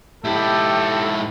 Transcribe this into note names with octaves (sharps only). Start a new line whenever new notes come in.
G#2 E4 G4 A4